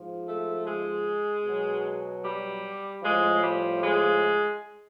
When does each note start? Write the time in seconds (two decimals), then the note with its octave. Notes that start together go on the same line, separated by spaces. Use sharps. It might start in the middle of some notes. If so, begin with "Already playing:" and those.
Already playing: G#2 F3
0.27 A3
0.65 G#3
1.44 B2 F#3
2.24 G3
3.02 A2 F3 G#3
3.42 G3
3.81 G#3